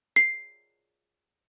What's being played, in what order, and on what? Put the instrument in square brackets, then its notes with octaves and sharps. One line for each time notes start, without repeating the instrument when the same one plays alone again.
[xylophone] C7